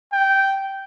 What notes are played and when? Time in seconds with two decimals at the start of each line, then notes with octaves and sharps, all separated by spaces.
0.12 G5